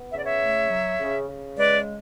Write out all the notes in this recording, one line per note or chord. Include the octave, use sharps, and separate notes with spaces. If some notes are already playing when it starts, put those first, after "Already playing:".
Already playing: B3
C#3 E5
D5
C#5 E5
A3
F#3
C#3
C#3
G#3 B4 D5